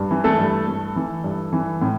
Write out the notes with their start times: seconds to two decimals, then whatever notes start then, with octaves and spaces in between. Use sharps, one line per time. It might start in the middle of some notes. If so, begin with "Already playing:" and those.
Already playing: G2
0.11 E3
0.24 A3 A4
0.39 G2
0.67 A3
0.96 E3
1.24 G2
1.53 E3
1.81 A2